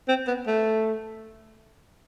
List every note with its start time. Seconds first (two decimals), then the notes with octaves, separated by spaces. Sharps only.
0.08 C4
0.27 B3
0.47 A3